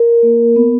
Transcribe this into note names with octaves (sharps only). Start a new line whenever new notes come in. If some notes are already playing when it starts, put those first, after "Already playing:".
Already playing: A#4
A#3
B3